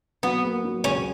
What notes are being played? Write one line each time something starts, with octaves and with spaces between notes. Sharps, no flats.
F#3 B3
A#3
F#3
C#2 C#4